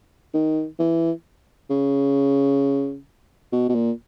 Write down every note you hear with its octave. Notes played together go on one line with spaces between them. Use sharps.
D#3
E3
C#3
B2
B2
A#2